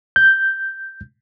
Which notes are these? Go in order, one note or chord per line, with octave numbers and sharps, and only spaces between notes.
G6